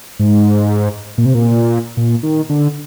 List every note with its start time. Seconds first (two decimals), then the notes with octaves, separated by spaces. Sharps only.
0.19 G#2
1.18 A#2
1.25 C3
1.34 A#2
1.97 A#2
2.23 D#3
2.49 D3